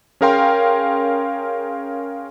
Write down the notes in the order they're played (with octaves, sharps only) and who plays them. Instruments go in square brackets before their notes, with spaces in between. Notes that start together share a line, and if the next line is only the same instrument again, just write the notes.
[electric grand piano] C#4 G#4 A#4 F5 G5 C6